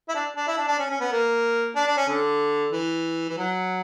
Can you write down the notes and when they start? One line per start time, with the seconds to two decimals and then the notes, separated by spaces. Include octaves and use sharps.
0.09 E4
0.15 D4
0.36 D4
0.48 E4
0.58 D4
0.68 D4
0.79 C#4
0.90 C#4
1.01 B3
1.12 A#3
1.76 D4
1.87 D4
1.97 C#4
2.09 D3
2.72 E3
3.29 E3
3.38 F#3